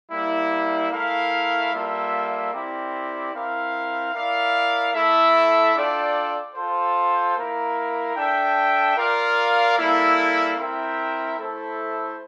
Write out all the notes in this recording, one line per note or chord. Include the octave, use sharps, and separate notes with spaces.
G3 A#3 E4
A3 E4 A#4 F5
G3 A#3 F4 A4 E5
C4 E4 G4 A#4 D5
C4 E4 A#4 F5
E4 A#4 D5 F5
A3 E4 A4 E5
D4 F4 A4 D5 G5
F4 A4 C5
A#3 E4 A#4
D4 A4 E5 G5
F4 A#4 D5 F5
G3 A#3 E4 A4
C4 E4 A#4 E5 G5
A3 E4 A4 C5 E5